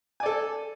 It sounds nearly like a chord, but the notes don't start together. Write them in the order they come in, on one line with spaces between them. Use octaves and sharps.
G#5 D5 A4